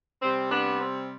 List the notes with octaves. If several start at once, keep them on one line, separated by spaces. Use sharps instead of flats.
C3 G3 C4
B3 D4
C4